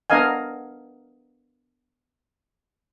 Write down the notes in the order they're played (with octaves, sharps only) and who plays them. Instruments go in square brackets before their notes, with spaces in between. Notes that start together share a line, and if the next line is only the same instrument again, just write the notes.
[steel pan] B3 D4 A#4 D#5 F5 G#5